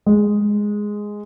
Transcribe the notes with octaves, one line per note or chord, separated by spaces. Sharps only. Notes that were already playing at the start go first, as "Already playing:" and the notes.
G#3